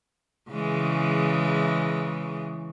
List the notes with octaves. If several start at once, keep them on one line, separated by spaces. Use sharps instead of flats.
C#3 E3 G#3